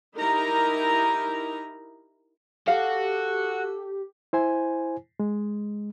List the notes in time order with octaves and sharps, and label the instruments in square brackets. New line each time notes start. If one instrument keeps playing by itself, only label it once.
[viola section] D#4 E4 G4 A#4 A#5
[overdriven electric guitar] F#4 [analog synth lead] G4 [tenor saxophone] A4 [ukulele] F5
[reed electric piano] E4 C5 G#5
G#3